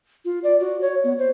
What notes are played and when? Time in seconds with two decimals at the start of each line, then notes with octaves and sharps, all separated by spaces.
0.25 F4
0.44 D5
0.60 F#4
0.81 C#5
1.04 B3
1.19 C5